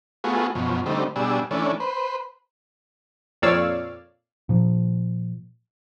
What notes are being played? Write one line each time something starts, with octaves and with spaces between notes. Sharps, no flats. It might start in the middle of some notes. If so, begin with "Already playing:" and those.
A3 B3 F4 F#4 G#4
F#2 B2 F3
D3 G3 A3 C4 D#4
B2 G3 D4 G#4 E6
E3 A3 C#4 D4
B4 C5
F2 A#2 C#5 D5 F5 E6
A#2 F3